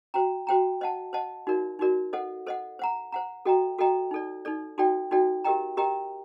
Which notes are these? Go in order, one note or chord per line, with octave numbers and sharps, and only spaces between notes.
F#4 C5 G5 A#5
F#4 C5 G5 A#5
C5 D#5 F#5 A5
C5 D#5 F#5 A5
D#4 F#4 A#4 D5
D#4 F#4 A#4 D5
A4 C5 D#5 F#5
A4 C5 D#5 F#5
C5 F#5 A#5
C5 F#5 A#5
F#4 A4 D#5 G5 A#5
F#4 A4 D#5 G5 A#5
D#4 A4 D5
D#4 A4 D5
D#4 F#4 A4 D5 G5
D#4 F#4 A4 D5 G5
G4 A#4 D#5 G5 A#5
G4 A#4 D#5 G5 A#5